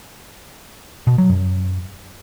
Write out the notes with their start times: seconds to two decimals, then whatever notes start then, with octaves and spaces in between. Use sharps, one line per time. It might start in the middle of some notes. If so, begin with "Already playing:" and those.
1.07 B2
1.18 F#3
1.30 F#2